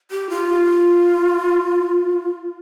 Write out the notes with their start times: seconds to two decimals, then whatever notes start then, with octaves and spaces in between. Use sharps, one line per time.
0.11 G4
0.30 F4